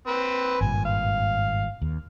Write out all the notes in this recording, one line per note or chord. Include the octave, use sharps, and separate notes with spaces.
C4 B4
G#1 G2 A#2 G#5
F5
D#2